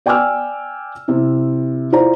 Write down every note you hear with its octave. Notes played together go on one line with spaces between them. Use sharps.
D5 G5 G#5 D6 E6 F6
C3 E4
E4 F4 C5 D5 A#5